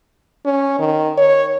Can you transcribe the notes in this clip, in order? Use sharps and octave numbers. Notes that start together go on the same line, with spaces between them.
C#4
D#3
C#5